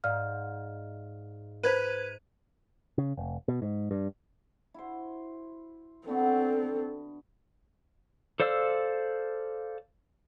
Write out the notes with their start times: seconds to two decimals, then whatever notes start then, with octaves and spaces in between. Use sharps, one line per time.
0.04 G#2 D5 F5 F6
1.63 B4 C5 G#6 D#7
2.98 C#3
3.17 F1
3.48 B2
3.62 G#2
3.91 G2
4.74 E4 F#4 C5
6.08 D3 B3 C4 F#4 A4
8.40 A4 C5 D5 F5 E6